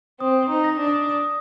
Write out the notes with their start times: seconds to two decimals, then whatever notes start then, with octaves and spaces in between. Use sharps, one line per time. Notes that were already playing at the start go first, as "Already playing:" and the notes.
0.20 C4 D#6
0.43 D#6
0.50 D#4
0.64 A#6
0.79 D4
0.87 D#6
1.09 D#6